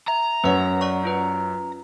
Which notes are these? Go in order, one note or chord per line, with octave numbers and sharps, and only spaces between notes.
E5 A#5
F#2 B4 C#5 F#5
D5 F#5 C#6
C#4 F4 B4